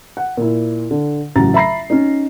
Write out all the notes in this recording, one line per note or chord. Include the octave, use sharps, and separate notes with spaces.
F#5
A#2 E4
D3
A1 C#3 F#3 A#5 A6
E5 A#5 B5 A#6 C7
C#4 D#4